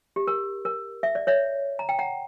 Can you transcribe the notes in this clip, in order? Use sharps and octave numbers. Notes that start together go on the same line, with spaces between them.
G4
A#4
A#4
E5
D5
C#5 E5
A#5
G5
F#5 A#5